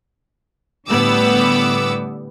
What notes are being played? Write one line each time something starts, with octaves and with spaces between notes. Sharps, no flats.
A2 D3 G3 B3 D6 E6